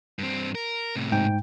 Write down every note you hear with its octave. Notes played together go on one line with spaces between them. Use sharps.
G2 C4
A#4
A2 C3
G#2 G5